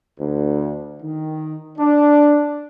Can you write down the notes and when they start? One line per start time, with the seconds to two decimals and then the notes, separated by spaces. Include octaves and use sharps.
0.20 D2
1.03 D#3
1.78 D4